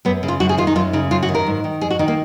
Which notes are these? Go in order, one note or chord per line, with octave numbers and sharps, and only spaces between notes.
F#2 B3
C#3
F4
F#2 F#4
G#4
D#3 F4
D#4
F#2 F4
C#3 D#4
F#2 F4
F#4
D#3
A#4
G#2
D#3
F2 G#4
F#4
D#3 D#4
A#3